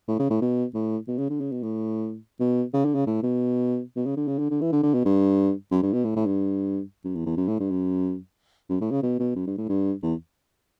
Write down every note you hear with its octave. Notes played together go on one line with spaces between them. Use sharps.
A2
C#3
A2
B2
A2
B2
C#3
D3
C#3
B2
A2
B2
C#3
D3
C#3
A2
B2
B2
C#3
D3
C#3
D3
D3
E3
D3
D3
B2
G2
F#2
G2
B2
A2
A2
G2
F#2
E2
E2
F#2
A2
G2
F#2
F#2
A2
C#3
B2
B2
F#2
G2
A2
G2
E2